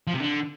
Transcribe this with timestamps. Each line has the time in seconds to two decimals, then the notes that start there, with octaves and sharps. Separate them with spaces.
0.07 F3
0.14 C3
0.21 D3